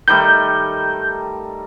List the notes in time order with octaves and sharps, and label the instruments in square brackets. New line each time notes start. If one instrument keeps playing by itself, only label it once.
[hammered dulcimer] D#3 G3 A3 [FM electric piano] G6